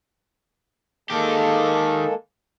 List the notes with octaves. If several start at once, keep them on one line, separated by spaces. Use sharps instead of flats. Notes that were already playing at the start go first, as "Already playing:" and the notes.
D#3 G#3 A#3 G4 A4